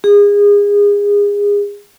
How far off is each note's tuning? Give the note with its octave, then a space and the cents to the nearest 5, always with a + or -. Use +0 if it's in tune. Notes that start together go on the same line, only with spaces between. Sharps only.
G#4 -30